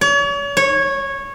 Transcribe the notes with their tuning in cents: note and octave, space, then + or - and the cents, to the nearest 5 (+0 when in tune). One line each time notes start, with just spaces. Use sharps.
C#5 +40
C#5 -15